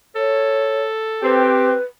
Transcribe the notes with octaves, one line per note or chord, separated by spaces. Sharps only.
A4 C#5
C4 G4 B4